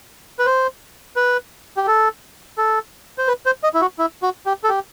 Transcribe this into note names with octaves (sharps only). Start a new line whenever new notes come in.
B4
C5
B4
G4
A4
A4
C5
B4
C5
D#5
E4
F#4
E4
F#4
G4
A4
G4